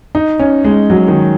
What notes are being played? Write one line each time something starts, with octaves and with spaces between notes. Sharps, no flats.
D#4
C#4
G#3
F#3
D#3